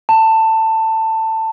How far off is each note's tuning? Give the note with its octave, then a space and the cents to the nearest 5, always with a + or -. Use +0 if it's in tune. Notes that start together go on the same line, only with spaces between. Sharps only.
A5 +15